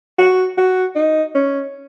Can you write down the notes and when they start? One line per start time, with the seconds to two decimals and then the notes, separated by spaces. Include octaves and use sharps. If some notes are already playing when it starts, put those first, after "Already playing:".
0.19 F#4
0.58 F#4
0.96 D#4
1.35 C#4